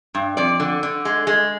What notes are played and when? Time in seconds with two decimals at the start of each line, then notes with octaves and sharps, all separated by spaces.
0.15 G2
0.37 F2 D5
0.60 D3
0.83 D3
1.05 G#3
1.27 G#3